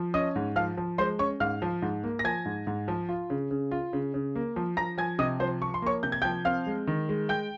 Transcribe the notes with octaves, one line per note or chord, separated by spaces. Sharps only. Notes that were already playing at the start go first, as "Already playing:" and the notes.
Already playing: F3
C#4 D#5 D#6
G#2
F3 F5 F6
F3
G#3 C5 C6
C#4 C#5 C#6
G#2 F5 F6
F3
G#2
A#3
A#6
F3 G#5 G#6
G#2
G#2
F3
F4
C#3
C#3
F4
C#3
C#3
A#3
F3
F3 A#5 A#6
F3 G#5 G#6
C3 D#5 D#6
F3 C5 C6
F3 C#6
C6
A#3 C#5 C#6
C3 G6
G#6
G5 G6
F3
C4 F5 F6
G#3
D#3
G#3
G#3 G5 G6